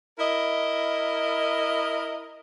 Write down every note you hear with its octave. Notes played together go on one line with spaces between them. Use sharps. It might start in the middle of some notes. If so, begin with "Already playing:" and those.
E4 A#4 D#5